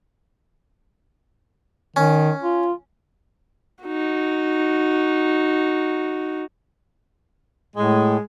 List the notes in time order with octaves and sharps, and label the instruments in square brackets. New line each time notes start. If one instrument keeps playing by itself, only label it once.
[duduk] D#3 [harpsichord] C#4
[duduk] F4
[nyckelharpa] D#4 F#4
[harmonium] A2 [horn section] G#3